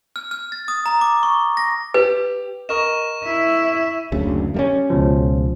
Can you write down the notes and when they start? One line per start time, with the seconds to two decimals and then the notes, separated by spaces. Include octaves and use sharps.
0.16 F6
0.31 F6
0.52 A6
0.68 D#6
0.86 A#5
1.01 D6
1.23 C#6
1.57 A#6
1.94 G4 B4
2.69 A#4 D#5 C#6 E7
3.24 E4 E5
4.12 F#1 D2 C#3
4.54 G3 A3 C#4
4.90 C#2 B2 F3